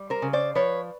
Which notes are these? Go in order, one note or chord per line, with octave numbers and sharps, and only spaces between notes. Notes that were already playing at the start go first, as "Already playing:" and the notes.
Already playing: G3
A#4 C5
C#3
C5 D5
F3 B4 C#5